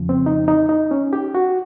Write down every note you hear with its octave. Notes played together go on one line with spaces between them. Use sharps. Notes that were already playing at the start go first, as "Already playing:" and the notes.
Already playing: F2 C#3 F3
C4
D#4
D#4
D#4
C#4
G4
F#4